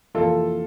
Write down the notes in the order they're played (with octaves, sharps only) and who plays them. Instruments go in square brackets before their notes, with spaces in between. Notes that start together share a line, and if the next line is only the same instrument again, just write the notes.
[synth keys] F2 C3 E3 A#3 [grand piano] F4 A4